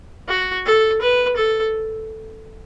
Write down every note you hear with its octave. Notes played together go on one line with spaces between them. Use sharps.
F#4
A4
B4
A4